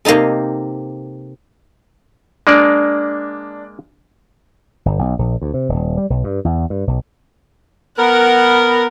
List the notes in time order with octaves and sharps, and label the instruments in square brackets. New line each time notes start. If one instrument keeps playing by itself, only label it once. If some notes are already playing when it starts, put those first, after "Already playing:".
[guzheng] C3 A#3 C4 D#4 A4
[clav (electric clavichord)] G#3 A#3 D5 [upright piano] D4
[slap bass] G1
B1
A#1
D2
C3
D#1
G3
B1
G2
E2
G2
B1
[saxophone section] B3 A#4 [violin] F#5